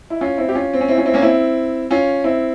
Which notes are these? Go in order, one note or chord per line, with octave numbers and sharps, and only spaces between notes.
E4
C#4 F4
C4 E4
G4
C#4 F4
C4
C#4
C4 E4
C#4 F4
C4 E4
A#3 C#4
C4 E4
C#4 F4
C4 E4